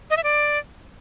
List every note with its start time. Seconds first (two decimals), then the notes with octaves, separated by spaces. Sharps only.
0.10 D#5
0.17 E5
0.24 D5